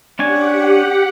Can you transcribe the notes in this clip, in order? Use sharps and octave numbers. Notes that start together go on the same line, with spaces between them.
C#4 D4 G4 F#5 G#5